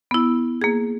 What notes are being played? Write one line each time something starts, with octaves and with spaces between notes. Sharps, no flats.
B3 E4
A#3 G#4